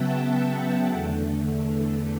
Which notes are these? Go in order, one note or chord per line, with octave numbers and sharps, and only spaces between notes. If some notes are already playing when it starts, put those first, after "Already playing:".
Already playing: C#3 F#3 B3 E5 F#5 G5 A5
E5 G5
E2 D3 A3